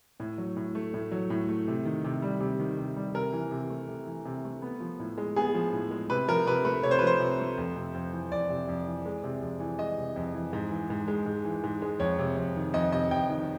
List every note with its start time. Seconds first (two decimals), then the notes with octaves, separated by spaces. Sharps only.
0.20 A2
0.38 F#3
0.56 A2
0.75 A3
0.94 A2
1.12 F#3
1.30 A2
1.48 A3
1.68 C3
1.85 D#3
2.04 C3
2.22 G3
2.40 C3
2.60 D#3
2.78 C3
2.96 G3
3.14 C3 A#4
3.33 E3
3.51 C3
3.70 A3
3.88 C3
4.07 E3
4.25 C3
4.44 A3
4.62 B3
4.80 F3
5.00 A2
5.17 G#3
5.36 B3 G#4
5.54 F3
5.73 A2
5.91 G#3
6.10 C3 B4
6.28 F3 A#4
6.47 C3 B4
6.65 A3 B4
6.83 C3 C#5
6.91 C5
6.99 F3 B4
7.07 C5
7.20 C3
7.39 A3
7.58 F2
7.76 C3
7.94 F2
8.12 E3
8.31 F2 D5
8.49 C3
8.69 F2
8.87 E3
9.05 G#3
9.24 C3
9.42 F2
9.60 E3
9.79 G#3 D#5
9.97 C3
10.16 F2
10.34 E3
10.53 G#2
10.71 E3
10.90 G#2
11.08 G#3
11.26 G#2
11.45 E3
11.63 G#2
11.82 G#3
12.00 F2 C#5
12.19 C3
12.37 F2
12.56 D#3
12.74 F2 D#5
12.92 C3 D#5
13.11 F2 G5
13.30 D#3